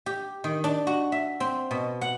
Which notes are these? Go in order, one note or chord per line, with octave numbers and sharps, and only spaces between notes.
G4
D#3
D4
F#4
E5
C4
B2
F#5